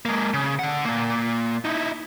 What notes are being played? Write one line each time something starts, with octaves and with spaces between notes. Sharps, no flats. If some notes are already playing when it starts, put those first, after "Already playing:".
G#3 A#3
C#3
D3 F#5
A#2 A#3
D#4 E4